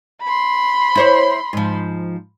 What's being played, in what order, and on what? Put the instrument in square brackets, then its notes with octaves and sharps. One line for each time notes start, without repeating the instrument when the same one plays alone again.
[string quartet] B5 C6
[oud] E4 C5 C#5
G#2 F3